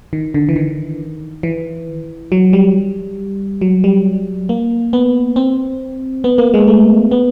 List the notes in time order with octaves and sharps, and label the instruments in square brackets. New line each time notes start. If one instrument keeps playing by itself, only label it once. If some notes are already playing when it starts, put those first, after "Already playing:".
[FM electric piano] D#3
D3
E3
D#3
E3
F#3
G3
F#3
G3
A#3
B3
C4
B3
A#3
G#3
A3
B3